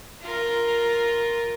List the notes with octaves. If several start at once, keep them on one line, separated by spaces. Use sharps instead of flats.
F4 A#4